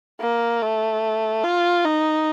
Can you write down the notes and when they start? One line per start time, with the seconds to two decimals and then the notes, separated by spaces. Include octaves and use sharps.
0.20 A#3
0.62 A3
1.44 F4
1.85 D#4